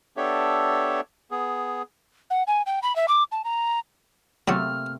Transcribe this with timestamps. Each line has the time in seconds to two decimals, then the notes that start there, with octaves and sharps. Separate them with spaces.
0.17 B3 D4 G4 A4 C#5 E5
1.31 B3 G#4
2.30 F#5
2.47 G#5
2.66 G5
2.83 B5
2.96 E5
3.08 D6
3.32 A5
3.45 A#5
4.48 C3 F#3 A3 A#3 F#4 F6